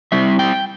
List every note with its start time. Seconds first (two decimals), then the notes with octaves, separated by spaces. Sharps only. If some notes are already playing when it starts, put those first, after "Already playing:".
0.12 G3 C4 E4 E5
0.39 G5